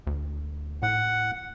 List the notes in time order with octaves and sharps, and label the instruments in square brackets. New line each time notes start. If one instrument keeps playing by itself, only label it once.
[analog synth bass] D2
[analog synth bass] A2 [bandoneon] F#5